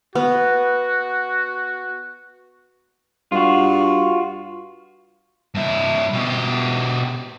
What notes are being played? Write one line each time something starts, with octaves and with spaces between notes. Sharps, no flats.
B3 F#4
G2 F4 F#4
G2 E4
B2 G4